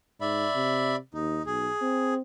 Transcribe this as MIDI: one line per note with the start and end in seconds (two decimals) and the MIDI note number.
0.21 0.47 44
0.21 0.96 74
0.21 0.96 76
0.21 0.96 83
0.55 0.98 48
1.14 1.40 39
1.14 1.42 63
1.46 1.69 35
1.46 2.14 68
1.82 2.22 60